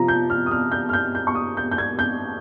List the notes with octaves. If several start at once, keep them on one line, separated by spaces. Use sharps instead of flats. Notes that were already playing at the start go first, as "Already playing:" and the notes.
Already playing: C3 F3 A#5
G6
F6
D#6
F6
G6
F6
G6
G6
C#6
D#6
G6
G6
G#6
G6